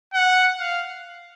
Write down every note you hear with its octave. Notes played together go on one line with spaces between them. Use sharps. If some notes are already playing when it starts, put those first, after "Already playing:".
F#5
F5